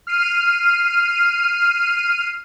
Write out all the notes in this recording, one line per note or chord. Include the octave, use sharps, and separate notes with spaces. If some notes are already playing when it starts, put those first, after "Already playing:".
F6 C7 D#7